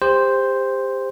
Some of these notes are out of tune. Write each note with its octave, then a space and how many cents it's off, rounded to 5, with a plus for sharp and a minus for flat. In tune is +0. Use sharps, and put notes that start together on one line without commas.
G4 +30 C5 +0